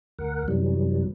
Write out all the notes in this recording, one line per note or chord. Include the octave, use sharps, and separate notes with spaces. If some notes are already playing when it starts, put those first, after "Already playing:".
D2 A#4 F#5
F#2 C3 E3 F#3 G3